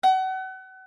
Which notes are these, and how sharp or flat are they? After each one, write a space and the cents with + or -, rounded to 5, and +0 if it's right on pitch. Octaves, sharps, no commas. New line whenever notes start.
F#5 +35